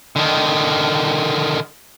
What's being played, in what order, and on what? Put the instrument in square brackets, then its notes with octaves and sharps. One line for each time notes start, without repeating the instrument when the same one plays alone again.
[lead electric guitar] D3 D#3